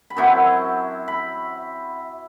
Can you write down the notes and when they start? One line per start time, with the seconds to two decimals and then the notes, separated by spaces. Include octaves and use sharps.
0.10 B5
0.17 F#2 F#3 C4 E4 A5
1.08 B5